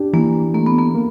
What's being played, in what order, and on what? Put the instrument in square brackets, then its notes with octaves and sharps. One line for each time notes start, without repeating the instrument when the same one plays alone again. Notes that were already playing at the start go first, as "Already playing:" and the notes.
Already playing: [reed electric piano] D4 G4
[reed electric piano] E3 [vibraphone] A#3
[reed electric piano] A3 [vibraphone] A#3
[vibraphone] B3
A#3
[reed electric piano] A#3